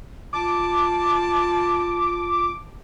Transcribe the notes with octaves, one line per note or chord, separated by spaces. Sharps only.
F4 A5 D6